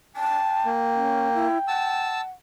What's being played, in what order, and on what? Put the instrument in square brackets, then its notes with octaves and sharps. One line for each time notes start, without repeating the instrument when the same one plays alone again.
[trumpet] G5 [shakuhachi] A5
[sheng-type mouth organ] A#3
[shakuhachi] C#4
E4
[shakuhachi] F#5 [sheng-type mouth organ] A5 E6